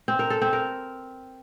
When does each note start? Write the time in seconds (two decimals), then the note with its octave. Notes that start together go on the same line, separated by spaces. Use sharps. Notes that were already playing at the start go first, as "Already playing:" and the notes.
0.08 C4
0.19 A#4
0.30 A4
0.42 C4
0.53 A#4